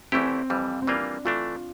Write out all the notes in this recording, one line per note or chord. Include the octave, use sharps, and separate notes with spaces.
E2 E3 A3 C4 E4 G4
F2 E3 G3
C4
E3 G3 A#3 D4 F4
E3 A3 D4 F4